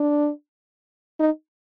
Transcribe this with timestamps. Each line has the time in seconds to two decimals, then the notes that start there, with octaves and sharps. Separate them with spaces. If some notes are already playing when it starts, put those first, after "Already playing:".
Already playing: D4
1.20 D#4